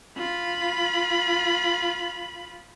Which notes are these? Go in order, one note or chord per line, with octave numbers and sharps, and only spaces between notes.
F4 B5